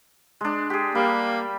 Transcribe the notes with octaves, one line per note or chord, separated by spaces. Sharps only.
G#3 D4
G4 G#4
G3 A#3